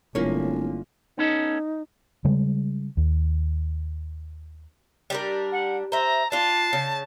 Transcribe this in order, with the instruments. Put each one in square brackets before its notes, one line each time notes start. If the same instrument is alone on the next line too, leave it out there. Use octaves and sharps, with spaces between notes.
[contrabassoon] D1 [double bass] G1 D3 [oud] A#3 C#4 [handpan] E4 F4
[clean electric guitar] B3 C#4 A4 [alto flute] D#4
[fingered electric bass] C#3 G3 G#3
D#2
[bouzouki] G3 D4 A#4
[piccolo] F#5
[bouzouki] C5 E5 [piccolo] A#5
[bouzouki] D4 F4 [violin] A5 [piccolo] C7
[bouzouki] C#3